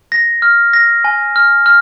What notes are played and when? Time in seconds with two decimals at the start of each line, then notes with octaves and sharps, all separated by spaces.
0.12 A#6
0.42 F6
0.73 A#6
1.04 G#5
1.36 F6
1.66 F6